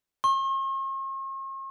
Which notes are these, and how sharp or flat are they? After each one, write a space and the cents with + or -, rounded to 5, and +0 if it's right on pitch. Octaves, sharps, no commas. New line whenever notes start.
C#6 -45